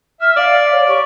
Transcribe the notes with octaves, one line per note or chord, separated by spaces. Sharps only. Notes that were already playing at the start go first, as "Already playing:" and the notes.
E5 F6
D5 F5
C#5
G4 C#6